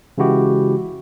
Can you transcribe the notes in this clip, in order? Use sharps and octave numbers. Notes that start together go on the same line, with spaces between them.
C#3 E3 G#3 E4 F#4 G4